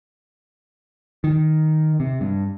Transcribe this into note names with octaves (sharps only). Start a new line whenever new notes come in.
D#3
C3
G2